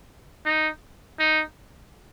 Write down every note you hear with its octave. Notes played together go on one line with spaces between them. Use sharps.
D#4
D#4